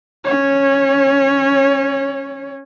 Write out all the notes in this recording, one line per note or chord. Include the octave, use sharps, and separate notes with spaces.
C#4 C#5